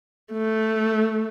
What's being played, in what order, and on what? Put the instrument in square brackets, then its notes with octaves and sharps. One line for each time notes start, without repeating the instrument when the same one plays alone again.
[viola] A3